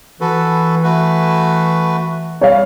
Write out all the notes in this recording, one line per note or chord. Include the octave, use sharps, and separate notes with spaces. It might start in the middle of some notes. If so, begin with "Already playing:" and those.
E3 F#4 A4 B4
A3 F#4 B4
G3 C#5 F5